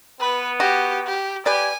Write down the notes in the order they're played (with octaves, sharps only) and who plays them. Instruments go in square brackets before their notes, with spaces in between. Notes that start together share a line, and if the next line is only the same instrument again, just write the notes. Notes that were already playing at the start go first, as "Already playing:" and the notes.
[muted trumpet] B3 [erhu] B4
[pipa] F#4 [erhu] G4
[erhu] G4
[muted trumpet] G4 [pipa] B4 D5 [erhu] G#5